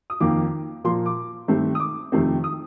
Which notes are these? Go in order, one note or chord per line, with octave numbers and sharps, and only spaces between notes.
D#6
F2 D#3 A#3 D6
A#2 F3 A#3 C6
D6
G2 D#3 A3 C4
D#6
D6
F2 C3 D#3 A3 C4
D#6